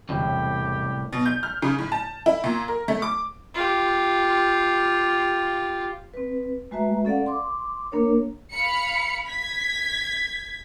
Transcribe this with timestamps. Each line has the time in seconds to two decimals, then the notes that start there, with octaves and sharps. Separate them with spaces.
0.09 E1 C2 A2 E4 G4 C#5 G5
1.13 B2
1.26 G6
1.43 F6
1.62 C#3
1.79 A2
1.92 A5
2.26 E4
2.44 A#2
2.68 A#4
2.88 A3
3.02 D6
3.54 F4 G4
6.14 C4 B4
6.71 G#3 A3 F#4 B4 E5 A#5
7.05 C#4 A4 D5 F5 F#5
7.26 C6 D6
7.92 A#3 D4 A#4 C#5
8.51 F5 B5 C#7
9.28 G#6 B6